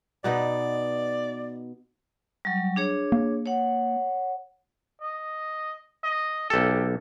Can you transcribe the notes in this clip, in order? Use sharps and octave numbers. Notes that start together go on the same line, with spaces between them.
B2 B3 D#4 D5
F#3 G3
D4 G#4 C#5
A#3
C#5 F#5
D#5
D#5
B1 G4 A4